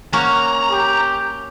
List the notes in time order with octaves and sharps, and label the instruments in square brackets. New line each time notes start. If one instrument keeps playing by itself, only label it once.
[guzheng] A#3 C#4 F#4 [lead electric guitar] A#5
[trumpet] G4